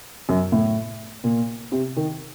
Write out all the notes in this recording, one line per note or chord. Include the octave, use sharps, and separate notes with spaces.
F#2
A2
A#2
C3
D#3